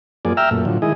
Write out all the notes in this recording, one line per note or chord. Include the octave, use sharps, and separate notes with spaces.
F#2 F3 A#3 G#4 D5
E5 G5 A#5 E6 F6
F#2 A#2 A3
A2 D3 F3 F#3
D#3 G#3 E4 G#4 D#5